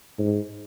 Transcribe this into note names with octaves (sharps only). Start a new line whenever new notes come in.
G#2